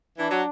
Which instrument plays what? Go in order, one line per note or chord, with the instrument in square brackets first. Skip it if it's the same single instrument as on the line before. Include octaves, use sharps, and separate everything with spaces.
[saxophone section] E3 [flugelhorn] D4
[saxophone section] F#3